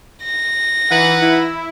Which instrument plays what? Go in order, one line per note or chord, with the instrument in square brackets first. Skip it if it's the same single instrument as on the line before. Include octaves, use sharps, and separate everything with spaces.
[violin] A#6
[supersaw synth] E3 [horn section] D#4 B4 F#5
[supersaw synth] E4